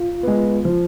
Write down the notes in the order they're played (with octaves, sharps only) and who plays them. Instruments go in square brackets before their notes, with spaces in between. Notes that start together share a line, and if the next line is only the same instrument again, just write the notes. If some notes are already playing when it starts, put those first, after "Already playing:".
Already playing: [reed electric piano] F4
[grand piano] G#3 B3
F3